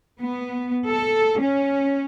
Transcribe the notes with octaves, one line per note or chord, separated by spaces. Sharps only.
B3
A4
C#4